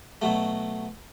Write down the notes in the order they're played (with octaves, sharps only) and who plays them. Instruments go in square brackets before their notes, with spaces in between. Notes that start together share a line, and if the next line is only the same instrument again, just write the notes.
[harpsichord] B2 F#3 A3